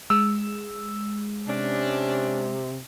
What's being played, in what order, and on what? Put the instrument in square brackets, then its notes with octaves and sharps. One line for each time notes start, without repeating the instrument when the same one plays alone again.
[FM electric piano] G#3 [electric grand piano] E6
[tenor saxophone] C3 [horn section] C#4 D4